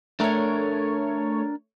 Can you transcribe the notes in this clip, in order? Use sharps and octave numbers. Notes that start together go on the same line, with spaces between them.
A3 D4 A#4 C#5